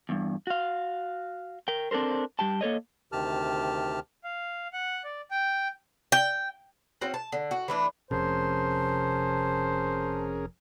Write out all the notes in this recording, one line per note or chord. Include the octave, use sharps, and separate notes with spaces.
E2 G2
F#4 F5
A#4 G5
C4 D4 A4 A#4 C5
G3 G4 G5 A5
A#3 A4 C#5 D#5
D2 C3 D#3 G4 A5 F6
F5
F#5
D5
G5
G5
C4 C#4 F#4
A5
D3
F#4
E3 A3 D4
F1 F2 C3 C#4 G#4 A#4 C5 A5